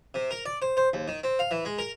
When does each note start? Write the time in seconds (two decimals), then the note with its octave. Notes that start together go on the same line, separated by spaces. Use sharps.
0.14 C3
0.31 A#4
0.46 D5
0.62 C5
0.77 C5
0.93 D#2
1.08 D#3
1.24 C4
1.39 F5
1.51 E3
1.65 G#3
1.78 A#4